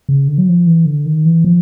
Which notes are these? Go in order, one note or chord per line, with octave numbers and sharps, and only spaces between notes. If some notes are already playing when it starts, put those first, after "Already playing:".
C#3
D3
F#3
F3
E3
D3
D#3
E3
F3